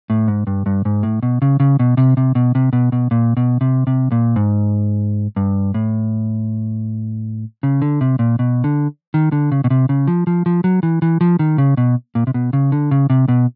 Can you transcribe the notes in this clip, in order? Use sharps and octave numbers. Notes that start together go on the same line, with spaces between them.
A2
G#2
G2
G2
G#2
A2
B2
C#3
C#3
B2
C3
C3
B2
C3
B2
B2
A#2
B2
C3
C3
A#2
G#2
G2
A2
C#3
D3
C3
A#2
B2
D3
D#3
D3
C#3
B2
C3
C#3
F3
F3
F3
F#3
E3
E3
F3
D#3
C#3
B2
A#2
C3
B2
C#3
D3
C#3
C3
B2